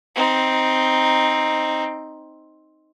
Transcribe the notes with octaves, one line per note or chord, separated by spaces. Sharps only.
C4 D#4